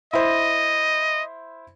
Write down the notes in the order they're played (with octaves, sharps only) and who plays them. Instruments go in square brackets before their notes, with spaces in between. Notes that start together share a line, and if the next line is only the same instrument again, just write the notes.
[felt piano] E4 C5 [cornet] D#5